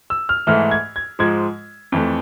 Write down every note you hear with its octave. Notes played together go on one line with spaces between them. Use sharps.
E6
F6
G#2 E3 A3 F6
G#6
G#6
G#2 F3 G#3 G#6
F2 E3 A3